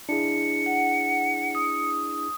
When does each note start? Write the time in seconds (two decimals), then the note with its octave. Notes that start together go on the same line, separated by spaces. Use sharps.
0.09 D4 E4 G#4 C#7
0.66 F#5
1.55 D#6